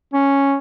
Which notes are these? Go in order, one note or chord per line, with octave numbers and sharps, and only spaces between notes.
C#4